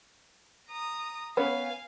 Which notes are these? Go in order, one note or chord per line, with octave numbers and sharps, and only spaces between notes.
A#5 D#6
B3 C#4 B4 F5 G#5